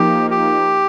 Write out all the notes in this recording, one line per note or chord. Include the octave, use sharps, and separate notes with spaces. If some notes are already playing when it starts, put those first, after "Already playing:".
Already playing: F3 A#3 D#4 G4
G4